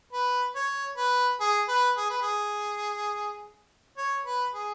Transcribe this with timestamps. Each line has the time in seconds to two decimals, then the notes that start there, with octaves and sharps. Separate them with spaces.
0.13 B4
0.55 C#5
0.97 B4
1.41 G#4
1.68 B4
1.97 G#4
2.10 B4
2.22 G#4
3.98 C#5
4.25 B4
4.54 G#4